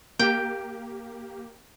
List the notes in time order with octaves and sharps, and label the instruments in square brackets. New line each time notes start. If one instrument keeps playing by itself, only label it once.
[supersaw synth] A#3 G4 [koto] G5